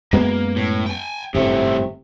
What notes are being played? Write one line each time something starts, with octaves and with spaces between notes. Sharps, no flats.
F#2 G#3 A#3 B3
A2
G5 G#5
G1 F#2 A2 C3 A3